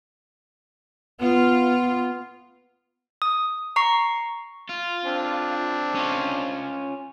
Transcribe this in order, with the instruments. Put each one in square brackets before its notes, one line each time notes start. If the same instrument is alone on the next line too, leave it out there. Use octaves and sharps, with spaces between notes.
[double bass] B3 [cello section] F4
[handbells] D#6
A#5 C#6 C7
[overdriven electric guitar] F4
[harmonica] C4 D4
[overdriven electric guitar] C#4 F4